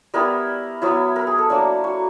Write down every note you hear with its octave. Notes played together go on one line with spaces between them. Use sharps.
G3 B3 E4 A#4
F#3 B3 E4
A#4
G#4
A4
F#3 A#3 D4
F#4